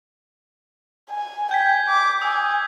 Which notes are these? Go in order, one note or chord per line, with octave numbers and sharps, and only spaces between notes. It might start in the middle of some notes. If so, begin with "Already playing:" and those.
G#5
G5 G6 G#6 B6
D6
G#5 D#6 E6